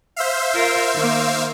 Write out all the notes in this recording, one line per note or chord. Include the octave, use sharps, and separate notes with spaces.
C5 E5 F5
F4 A#4
D#3 A#3